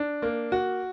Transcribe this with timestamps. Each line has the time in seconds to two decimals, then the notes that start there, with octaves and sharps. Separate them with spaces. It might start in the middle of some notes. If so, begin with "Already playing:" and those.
Already playing: D4
0.22 A#3
0.52 F#4